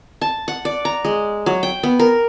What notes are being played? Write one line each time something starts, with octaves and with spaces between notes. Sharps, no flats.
A5
F#5
D5
A#5
G#3
F#3
G5
B3
A#4